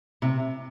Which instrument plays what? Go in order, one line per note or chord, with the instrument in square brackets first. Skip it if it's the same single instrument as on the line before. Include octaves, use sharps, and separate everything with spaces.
[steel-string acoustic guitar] C3